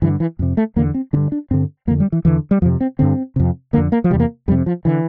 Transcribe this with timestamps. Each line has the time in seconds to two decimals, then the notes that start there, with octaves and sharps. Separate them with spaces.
0.02 G2 D3 E3
0.20 E3
0.39 F2 C3
0.57 A3
0.76 E2 D3 A#3
0.94 C4
1.13 G2 D3 D4
1.32 D4
1.51 G2 D3 C4
1.87 F2 A#3
1.90 D3
2.00 G3
2.12 E3
2.25 E2 D3 E3
2.51 G3
2.62 F2 F3
2.66 C3
2.81 C4
2.99 G2 D3 C4
3.36 F2 C3
3.73 D3 A#3
3.77 F2
3.92 A#3
4.04 F3
4.10 C3 G3
4.14 E2
4.20 A#3
4.48 F2 G3
4.52 C3
4.66 F3
4.85 D3 E3